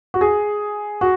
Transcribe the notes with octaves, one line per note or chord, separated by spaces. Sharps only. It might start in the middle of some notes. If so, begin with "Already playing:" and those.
F#4
G#4
F#4